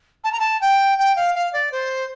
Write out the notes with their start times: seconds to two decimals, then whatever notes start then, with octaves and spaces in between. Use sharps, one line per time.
0.24 A5
0.32 A#5
0.40 A5
0.61 G5
0.98 G5
1.16 F5
1.35 F5
1.53 D5
1.72 C5